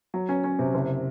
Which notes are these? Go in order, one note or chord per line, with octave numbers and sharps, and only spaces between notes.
F#3
C#4
C#4
C3
F#1